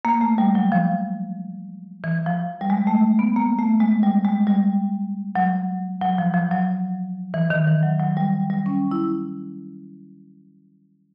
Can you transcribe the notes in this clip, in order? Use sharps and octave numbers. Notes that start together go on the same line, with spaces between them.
A#3
A3
G3
F#3
F3
E3
F3
G3
G#3
A3
B3
A#3
A3
G#3
G3
G#3
G3
F#3
F#3
F3
F3
F#3
E3
D#3
E3
F#3
F#3
G3
G3
C#4
E4